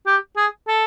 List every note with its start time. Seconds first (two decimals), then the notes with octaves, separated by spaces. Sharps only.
0.07 G4
0.37 G#4
0.68 A4